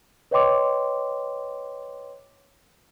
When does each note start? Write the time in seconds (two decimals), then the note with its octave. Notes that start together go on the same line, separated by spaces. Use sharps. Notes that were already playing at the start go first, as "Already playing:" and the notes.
0.31 B4 C#5 D#5 G5 C6 D6